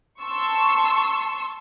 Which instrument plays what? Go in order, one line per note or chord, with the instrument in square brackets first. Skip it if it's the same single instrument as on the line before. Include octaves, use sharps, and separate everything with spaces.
[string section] A5 C6 C#6 E6